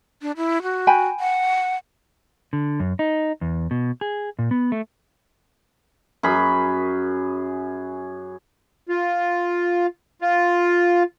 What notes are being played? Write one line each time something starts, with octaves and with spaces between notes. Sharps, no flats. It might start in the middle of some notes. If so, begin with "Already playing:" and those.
D4
E4
F#4
G5 G#5 B5
F#5
D3
F#2
D#4
E2
B2
G#4
A#2
B3
A3
F#2 G#4 B5
F4
F4